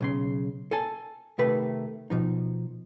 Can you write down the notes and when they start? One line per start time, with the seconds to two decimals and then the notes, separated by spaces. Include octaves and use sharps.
0.01 B1 C#3 C6
0.71 A4 G#5 A5
1.38 C3 D#3 A3 B4
2.10 B2 F3 D#4